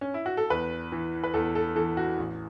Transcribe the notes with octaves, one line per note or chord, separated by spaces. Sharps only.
C#4
E4
F#4
A4
E2 B4
E3
B4
E2 A4
A4
E3 A4
F#4
A1